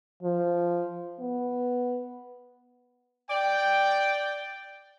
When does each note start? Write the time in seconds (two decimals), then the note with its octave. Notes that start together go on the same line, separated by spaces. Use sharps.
0.23 F3
1.20 B3
3.29 D5 G5